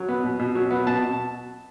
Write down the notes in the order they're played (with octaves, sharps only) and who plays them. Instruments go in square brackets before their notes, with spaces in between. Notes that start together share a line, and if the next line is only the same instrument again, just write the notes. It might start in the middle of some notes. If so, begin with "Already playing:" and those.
Already playing: [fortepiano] F#3
B3
B2
B2
F#3
B3
B2 A5